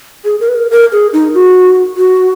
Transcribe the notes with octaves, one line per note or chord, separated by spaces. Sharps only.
G#4
A#4
B4
A#4
A#4
G#4
D#4
F#4
F#4